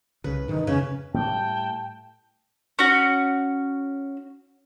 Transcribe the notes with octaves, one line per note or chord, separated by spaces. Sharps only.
C2 C#3 B4
G#2 D#3 E3 D#4
F2 C#3 C#4 B4
A2 G3 G5 A5
C#4 F#4